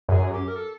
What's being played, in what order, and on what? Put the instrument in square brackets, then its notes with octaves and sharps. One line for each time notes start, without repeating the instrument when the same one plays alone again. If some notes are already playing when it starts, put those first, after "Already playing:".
[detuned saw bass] F#2 [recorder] G#4
[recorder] G4
A#4
A4